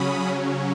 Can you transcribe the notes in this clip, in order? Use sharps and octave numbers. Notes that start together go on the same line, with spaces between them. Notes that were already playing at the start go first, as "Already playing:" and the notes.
Already playing: C#3 F#3 C#4 B5 D#6